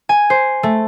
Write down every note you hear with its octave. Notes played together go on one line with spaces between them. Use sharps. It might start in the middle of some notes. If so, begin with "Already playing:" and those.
G#5
C5
A3